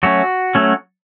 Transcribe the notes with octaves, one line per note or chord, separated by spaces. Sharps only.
F#3 A3 C#4 F#4
F#3 A3 C#4